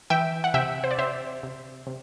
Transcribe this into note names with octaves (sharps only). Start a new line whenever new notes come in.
E3 E5 G5
F#5
C3 E5 G5
C5
D5
C3 C5 E5
C3
C3